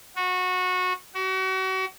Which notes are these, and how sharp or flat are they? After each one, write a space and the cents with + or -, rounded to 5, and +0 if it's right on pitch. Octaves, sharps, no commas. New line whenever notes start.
F#4 -20
F#4 +35